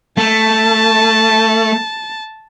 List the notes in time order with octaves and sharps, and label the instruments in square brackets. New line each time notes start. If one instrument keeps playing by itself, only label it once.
[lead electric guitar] A3 [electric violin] A5